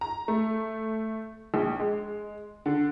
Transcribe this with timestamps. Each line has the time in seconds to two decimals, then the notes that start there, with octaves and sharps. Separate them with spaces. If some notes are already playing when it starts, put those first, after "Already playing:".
0.01 A#5
0.28 A3
1.54 A#1
1.80 G#3
2.66 D3